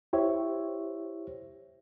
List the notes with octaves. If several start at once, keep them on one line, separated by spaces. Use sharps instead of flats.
E4 G4 C5 C#5 E5